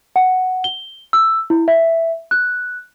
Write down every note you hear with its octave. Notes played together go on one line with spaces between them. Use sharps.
F#5
G7
E6
E4
E5
F#6